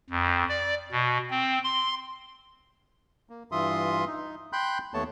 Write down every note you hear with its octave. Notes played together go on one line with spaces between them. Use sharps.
F2
D5
B2
C4
C6
A#3
G2 E3 F4 E5 C6 D#6
D#4
G5 B5 C6 F#6 G6
D#2 A3 B3 C#5 A5